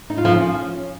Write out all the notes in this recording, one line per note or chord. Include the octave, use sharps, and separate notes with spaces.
D#4
F4
F3
C#4